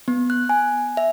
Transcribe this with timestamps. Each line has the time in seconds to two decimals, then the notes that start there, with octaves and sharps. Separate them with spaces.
0.08 B3
0.30 F#6
0.49 G#5
0.97 E5